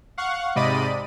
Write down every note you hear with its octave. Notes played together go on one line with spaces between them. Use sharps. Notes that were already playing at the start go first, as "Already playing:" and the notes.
F5 F#5 C#6
G#2 C3 D5 D#5 B5 D#7